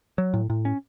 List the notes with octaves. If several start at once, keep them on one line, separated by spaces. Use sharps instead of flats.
F#3
A2
A2
C#4